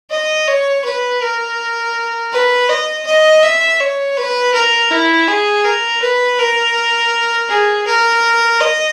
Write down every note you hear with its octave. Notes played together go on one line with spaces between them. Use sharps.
D#5
C#5
B4
A#4
B4
D#5
D#5
E5
C#5
B4
A#4
E4
G#4
A#4
B4
A#4
G#4
A#4
D#5